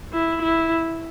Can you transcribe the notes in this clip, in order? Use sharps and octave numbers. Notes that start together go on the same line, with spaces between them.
E4
E4